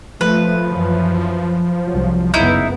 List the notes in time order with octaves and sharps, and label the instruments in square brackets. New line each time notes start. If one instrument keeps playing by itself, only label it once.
[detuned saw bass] F3 [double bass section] A3 [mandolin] B4
[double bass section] F#2 E3 F#3
C2 G2 F#3
[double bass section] F#1 B3 [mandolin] D#4 E4 G6